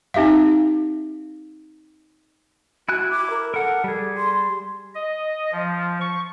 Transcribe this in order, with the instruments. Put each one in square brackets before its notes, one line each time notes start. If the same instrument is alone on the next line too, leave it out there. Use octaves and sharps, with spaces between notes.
[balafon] C4 D#4 G4 E5 F5
[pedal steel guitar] E4 G#5 F#6 [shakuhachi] F#4
[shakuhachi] D6
A#4
[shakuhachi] A4 [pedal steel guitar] A#4 F#5
[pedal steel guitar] G3 G#4
[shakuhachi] C6
[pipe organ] D#5
F3
C#6